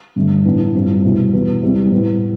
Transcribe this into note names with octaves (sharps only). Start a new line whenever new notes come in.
G2 D3 A3
A2 E3 B3 D4
G2 F3 C4 E4
C2 B2 A3 E4
E2 B2 B3
C2 C3 G3 C4 E4
A2 G3 B3